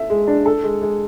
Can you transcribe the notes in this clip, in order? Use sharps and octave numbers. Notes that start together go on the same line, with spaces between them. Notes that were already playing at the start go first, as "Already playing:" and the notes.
Already playing: A4 E5
G#3
D4
A4
G#3
G#3